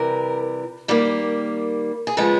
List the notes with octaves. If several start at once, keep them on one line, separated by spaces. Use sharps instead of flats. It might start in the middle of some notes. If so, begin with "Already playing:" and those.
Already playing: C3 E3 G3 A#4
D#3 G3 A#3
G#4
C#3 F3 G#3 B3 A4